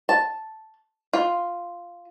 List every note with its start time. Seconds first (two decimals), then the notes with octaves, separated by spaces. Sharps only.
0.09 A5
1.13 F4